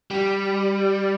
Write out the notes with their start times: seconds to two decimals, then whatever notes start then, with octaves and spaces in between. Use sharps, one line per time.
0.11 G3